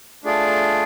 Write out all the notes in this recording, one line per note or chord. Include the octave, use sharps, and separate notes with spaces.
A3 D4 F4 G#4 D5